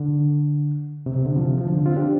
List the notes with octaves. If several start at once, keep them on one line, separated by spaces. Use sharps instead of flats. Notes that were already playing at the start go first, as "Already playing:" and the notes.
Already playing: D3
C3
C3
D3
C3 F3
F3
D3
D3
C4 F4
D4 G4